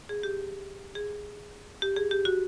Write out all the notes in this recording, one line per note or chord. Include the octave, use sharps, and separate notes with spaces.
G#4
G4
G#4
G4
G#4
G4
F#4